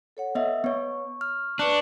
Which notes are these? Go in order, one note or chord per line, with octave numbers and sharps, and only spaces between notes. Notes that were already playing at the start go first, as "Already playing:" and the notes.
A4 C#5 F#5
B3 D#5 E5
B3 C#5 C#6
F6
D4 B4 C#6 D6 F#6 C#7